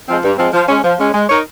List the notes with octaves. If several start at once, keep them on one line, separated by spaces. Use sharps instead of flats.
F3 G#3 C4
G2
F3 G#3 C4
F3
G#3 C#4
F3
G#3 C#4
G#3
D#4 A#4 C#5